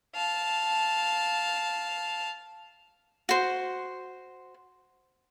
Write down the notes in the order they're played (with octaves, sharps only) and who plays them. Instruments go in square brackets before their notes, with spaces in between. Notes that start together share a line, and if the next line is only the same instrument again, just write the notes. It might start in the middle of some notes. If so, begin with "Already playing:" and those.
[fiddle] F5 A5
[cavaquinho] F#4 C5